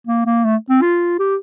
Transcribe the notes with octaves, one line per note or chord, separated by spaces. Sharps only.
A#3
A#3
A3
C4
F4
G4